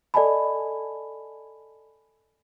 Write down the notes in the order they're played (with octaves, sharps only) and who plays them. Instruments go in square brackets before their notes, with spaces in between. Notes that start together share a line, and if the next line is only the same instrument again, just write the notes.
[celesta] A4 D5 D#5 G#5 A5 B5